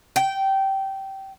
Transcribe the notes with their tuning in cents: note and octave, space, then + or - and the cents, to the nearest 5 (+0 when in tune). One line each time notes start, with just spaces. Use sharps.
G5 -15